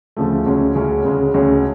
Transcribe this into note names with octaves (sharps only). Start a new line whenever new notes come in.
D2 C#3 F3 A3
D2 C#3 G#3 C#4
D2 C#3 G#3 C#4
D2 C#3 G#3 C#4
D2 C#3 G#3 C#4